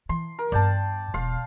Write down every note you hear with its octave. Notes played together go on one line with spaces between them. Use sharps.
E3 C6
A#4
G2 B3 D5 G5 A5
E1 F5 C6